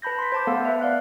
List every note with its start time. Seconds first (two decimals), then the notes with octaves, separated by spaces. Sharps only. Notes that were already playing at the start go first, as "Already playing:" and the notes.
0.02 B4 A5 B5 G6 A#6
0.19 C6 B6
0.32 C5 A5 D6
0.47 A3 B3 A4 F5 F#5
0.65 B4 E5
0.81 D5 F5 F#6